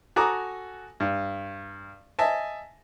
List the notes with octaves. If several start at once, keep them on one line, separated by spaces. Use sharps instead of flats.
F#4 A4 G#5 A#5 D6 D#6
G2
D#5 E5 G#5 A5